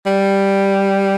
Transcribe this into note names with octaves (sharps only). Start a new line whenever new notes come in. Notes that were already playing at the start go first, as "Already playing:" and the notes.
G3